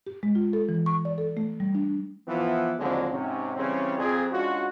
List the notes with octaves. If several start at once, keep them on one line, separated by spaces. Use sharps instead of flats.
G4
G#3
F4
A4
E3
C#6
D5
A4
A3
G3
D4
E3 F3 B3
D#2 D3 F3 F#3 G#3 C4
G#2 C3 C#4
C#3 E3 G3 C4 C#4
F2 C4 G#4
G#3 C#4 D4 F4 F#4